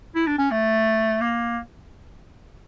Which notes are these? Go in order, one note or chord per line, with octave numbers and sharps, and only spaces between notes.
E4
D4
C#4
A3
A#3